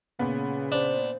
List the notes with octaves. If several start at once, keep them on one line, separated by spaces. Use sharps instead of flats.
A#2 C#3 B3
D4 C5